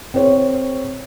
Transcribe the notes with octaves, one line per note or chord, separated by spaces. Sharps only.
C4 G#4 C5 C#5